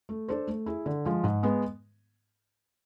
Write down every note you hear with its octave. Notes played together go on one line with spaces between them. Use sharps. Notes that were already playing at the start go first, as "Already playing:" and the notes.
A3
D4 A4 C5
A3
E4 G#4
D3
F3 G#3
G#2
G#3 B3